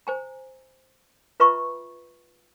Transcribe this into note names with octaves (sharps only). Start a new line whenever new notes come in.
C5 G#5 A#5
F4 B4 E5 A#5 B5 C#6